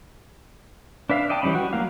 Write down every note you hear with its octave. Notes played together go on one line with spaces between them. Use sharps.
D4 B4 E5 F5
D5 D#5 G5 A5
E3 G3 C4 C#4 B5
F#4
F#3 A#3 F5